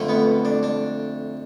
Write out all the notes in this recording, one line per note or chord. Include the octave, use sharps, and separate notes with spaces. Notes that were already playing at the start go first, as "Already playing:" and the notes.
Already playing: F2 D3 A3
B3
D4
D4